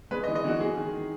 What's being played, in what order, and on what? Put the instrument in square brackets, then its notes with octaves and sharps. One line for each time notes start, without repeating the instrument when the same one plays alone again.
[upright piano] G#3 B4
D#5
E3
D#5
E3 F#4
G#3 G#4
D#3
D#3